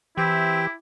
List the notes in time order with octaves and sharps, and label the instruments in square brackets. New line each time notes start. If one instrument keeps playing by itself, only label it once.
[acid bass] E3 [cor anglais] C4 [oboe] E4 [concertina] G4 G5